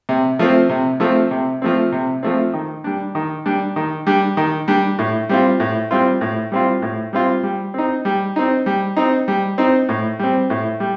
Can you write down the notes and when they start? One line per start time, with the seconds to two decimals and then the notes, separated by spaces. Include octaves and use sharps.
0.09 C3
0.39 F3 A3 C4
0.69 C3
1.00 F3 A3 C4
1.31 C3
1.62 F3 A3 C4
1.92 C3
2.23 F3 A3 C4
2.54 D#3
2.84 G3 D4
3.15 D#3
3.46 G3 D4
3.76 D#3
4.07 G3 D4
4.37 D#3
4.68 G3 D4
4.99 A2
5.29 G3 C4 F4
5.60 A2
5.91 G3 C4 F4
6.21 A2
6.52 G3 C4 F4
6.82 A2
7.13 G3 C4 F4
7.43 G3
7.74 C4 D#4
8.05 G3
8.36 C4 D#4
8.66 G3
8.97 C4 D#4
9.28 G3
9.58 C4 D#4
9.89 A2
10.19 G3 C4
10.50 A2
10.80 G3